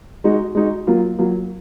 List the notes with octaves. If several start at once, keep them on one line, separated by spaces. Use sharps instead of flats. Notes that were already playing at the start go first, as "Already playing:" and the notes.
G#3 D#4 F#4
G#3 D#4 F#4
F#3 A#3 F4
F#3 A#3 F4